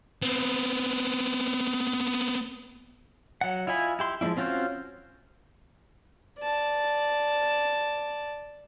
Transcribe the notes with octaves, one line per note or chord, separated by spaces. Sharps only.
B3 C4
F#3 F#5
E4 F4 D#5 G#5 B5
E4 G4 C6
F3 G#3 A#3 D4 E4
C4 C#4 F4 F#4 C5
D5 A5